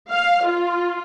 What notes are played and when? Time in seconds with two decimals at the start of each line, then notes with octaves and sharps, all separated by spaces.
0.10 F5
0.47 F4